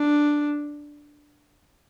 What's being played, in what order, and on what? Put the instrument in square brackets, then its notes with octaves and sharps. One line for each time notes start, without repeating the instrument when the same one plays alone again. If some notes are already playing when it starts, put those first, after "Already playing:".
Already playing: [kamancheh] D4